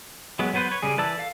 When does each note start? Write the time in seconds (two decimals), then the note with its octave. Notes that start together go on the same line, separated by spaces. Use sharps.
0.39 F#3 G#3 B3
0.54 F#3 B3 B4 C5
0.69 B4 C#5
0.82 C#3 G3 G#4
0.97 E3 B4 D5 A5 E6
1.17 A4 F5